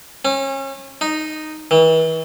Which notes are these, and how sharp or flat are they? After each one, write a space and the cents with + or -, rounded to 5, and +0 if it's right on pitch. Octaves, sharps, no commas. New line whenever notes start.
C#4 -30
D#4 -5
E3 -40